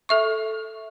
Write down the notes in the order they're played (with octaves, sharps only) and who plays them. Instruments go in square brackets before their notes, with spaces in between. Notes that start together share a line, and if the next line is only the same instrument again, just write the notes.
[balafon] A4 E5 C#6